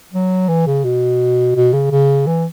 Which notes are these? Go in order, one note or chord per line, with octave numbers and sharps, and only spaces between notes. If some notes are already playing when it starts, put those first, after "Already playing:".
F#3
E3
C#3
B2
B2
C#3
C#3
E3